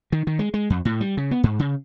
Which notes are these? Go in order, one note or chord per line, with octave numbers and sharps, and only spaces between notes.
D#3
D#3
G#3
G#3
F2
A2
G3
C#3
B3
G#2
C#3